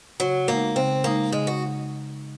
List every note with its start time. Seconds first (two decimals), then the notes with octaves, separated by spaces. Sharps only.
0.20 C#3 F#3
0.48 G#3 A#3 D#4
0.76 C#3 C4
1.04 G#3 A#3 D#4
1.32 C#3 G#3
1.47 F#4